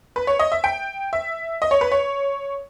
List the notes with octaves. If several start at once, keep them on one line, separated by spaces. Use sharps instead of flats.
B4
C#5
D#5
E5
G5
E5
D#5
C#5
B4
C#5